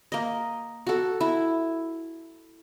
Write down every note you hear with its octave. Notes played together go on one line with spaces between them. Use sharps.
A#3 D#5
F#4 A4
E4